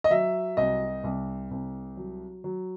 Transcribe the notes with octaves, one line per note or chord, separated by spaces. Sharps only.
D#5
F#3 E5
C2 D#5
C2
C2
F#3
F#3